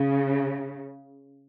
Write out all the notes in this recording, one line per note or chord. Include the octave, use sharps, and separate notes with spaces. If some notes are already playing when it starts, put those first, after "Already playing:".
Already playing: C#3